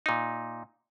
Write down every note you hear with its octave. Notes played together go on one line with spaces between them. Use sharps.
A#2 D#4